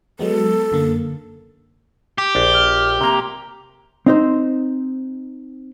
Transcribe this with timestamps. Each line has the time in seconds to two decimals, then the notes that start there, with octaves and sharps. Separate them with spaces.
0.19 F#3 G#3 B3 A4
0.72 F#2 D3 A#3
2.18 G4
2.35 A#1 D4
2.53 F6
3.01 C3 A#3 A#5
4.06 C4 D#4 C5